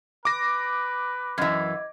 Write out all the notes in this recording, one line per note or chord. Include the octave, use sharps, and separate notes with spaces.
B4 D6 A#6
F#2 E3 D#5 G#6